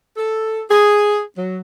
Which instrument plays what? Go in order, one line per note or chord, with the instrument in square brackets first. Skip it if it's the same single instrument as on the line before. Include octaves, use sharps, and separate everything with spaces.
[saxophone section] A4
G#4
F#3